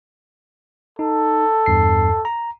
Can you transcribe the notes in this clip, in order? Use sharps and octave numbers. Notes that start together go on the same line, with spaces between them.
D#4 A4
E2 G2 C7
A#5